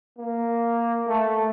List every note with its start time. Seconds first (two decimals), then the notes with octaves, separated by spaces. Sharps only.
0.18 A#3
1.07 A3